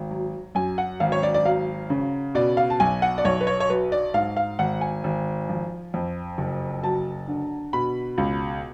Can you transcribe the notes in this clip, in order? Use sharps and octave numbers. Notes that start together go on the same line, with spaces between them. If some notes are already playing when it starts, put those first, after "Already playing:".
Already playing: G#1
F#3
F#2 G#5
F#5
G#1 F5
C#5
D5
D5
F#3 F5
C#3
B2 D5
F5
A5
B1 G#5
F#5
D5
B1 C#5
B4
C#5
C#5
F#3 B4
D5
G#2 F5
F5
G#1 F#5
G#5
G#1
F3
F2
F#1
F#3 A5
D3
B2 B5
C#2